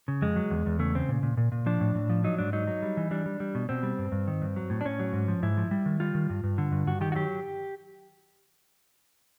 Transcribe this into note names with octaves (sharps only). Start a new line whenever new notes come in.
C#3
F2 G#3
F#3
E2
E2
C#3 A3
C#3 C4
A#2
A#2
A#2
A#2
F3 D4
A2
A2
F3
F#3 D#4
G#2 D4
F#3 D#4
F#3
G3
E3
G3 D4
G3
G3
B2
B2 C4
G3
G2
G2
D#3
G2
F#3
A2
D4
A2 C#4
F#3
G#2
F3
G#2 E4
F3
G3
D#3
G3 F4
D#3
G2
G2
D3
G2
G2 F#4
D#3 G4
F#4
F#3 G4